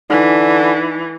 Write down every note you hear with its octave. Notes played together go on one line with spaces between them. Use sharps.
D3 E3 D#4 G#5 B6